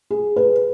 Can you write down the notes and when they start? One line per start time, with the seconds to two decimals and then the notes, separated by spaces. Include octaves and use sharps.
0.11 G#4
0.36 B4